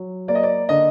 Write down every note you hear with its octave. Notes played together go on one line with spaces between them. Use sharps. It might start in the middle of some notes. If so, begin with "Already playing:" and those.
Already playing: F#3
A#3 D5
D#5
D5
D3 D#5